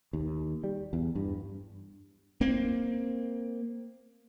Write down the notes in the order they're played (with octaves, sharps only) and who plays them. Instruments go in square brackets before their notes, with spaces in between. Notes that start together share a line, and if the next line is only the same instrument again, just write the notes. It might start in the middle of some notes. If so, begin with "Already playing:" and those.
[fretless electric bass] D#2
G3
E2
G2
[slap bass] A#3 C4